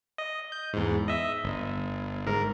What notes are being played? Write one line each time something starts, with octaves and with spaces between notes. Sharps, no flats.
D#5
G6
E2 G#2
D#5 E5
G1
G#2 A#4